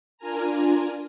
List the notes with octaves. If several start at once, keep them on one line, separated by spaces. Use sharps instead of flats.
D4 F4 A#4 G#5 A#5